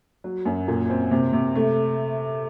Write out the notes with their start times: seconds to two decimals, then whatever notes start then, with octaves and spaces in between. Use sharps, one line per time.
0.24 F#3
0.46 F#2
0.68 A#2
0.90 C4
1.11 C3
1.33 C3
1.56 A3